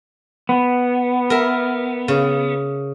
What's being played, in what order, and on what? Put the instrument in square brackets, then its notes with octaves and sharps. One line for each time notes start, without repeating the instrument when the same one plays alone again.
[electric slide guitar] B3
[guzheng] A#4 E5
C#3